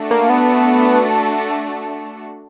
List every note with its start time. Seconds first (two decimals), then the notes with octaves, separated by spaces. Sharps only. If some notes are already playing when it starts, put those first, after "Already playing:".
Already playing: A3 D4 F#4 A4
0.11 A#3
0.29 B3